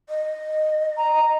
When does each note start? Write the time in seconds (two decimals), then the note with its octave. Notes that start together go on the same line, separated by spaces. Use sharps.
0.09 D#5
0.97 A#5